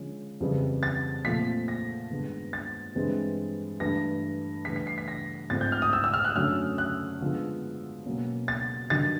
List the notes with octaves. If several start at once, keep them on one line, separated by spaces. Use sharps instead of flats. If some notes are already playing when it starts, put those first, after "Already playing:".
Already playing: D3 F3 G#3 C#4
F2 C#3 E3 G3
A6
A#2 F3 A3 C4 B6
A#6
G2 D#3 G#3 B3
A6
G2 E3 G#3 C4
G2 E3 A3 A#6
G2 E3 A3 B6
B6
C7
B6
A#6
G#2 F3 A3 C4 A6
G6
F6
D#6
E6
E6
F6
F#6
F#2 D3 F#3 A3 C#4 F6
F#6
D3 F3 G#3 B3
B2 F#3 A#3 C#4
A6
G2 D#3 F#3 A6